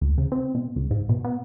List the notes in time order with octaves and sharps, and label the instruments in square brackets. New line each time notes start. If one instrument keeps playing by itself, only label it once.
[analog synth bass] D2
C#3
C4
B2
C#2
G#2
B2
B3